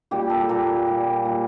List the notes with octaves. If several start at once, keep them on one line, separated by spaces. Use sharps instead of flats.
A#2 G3 G4
A4
A#2 G3 A#4
A#2 G3
A#2 G3